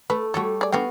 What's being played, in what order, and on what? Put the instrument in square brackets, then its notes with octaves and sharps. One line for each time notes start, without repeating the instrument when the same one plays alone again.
[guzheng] A3 [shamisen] B4
[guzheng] G3 A3 C#5 [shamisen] F#4 A4
[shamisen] G#4 D5
[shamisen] D3 G5 [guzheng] B3 F#4 F5